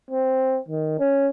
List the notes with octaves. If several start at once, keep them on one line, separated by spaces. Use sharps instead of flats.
C4
D#3
C#4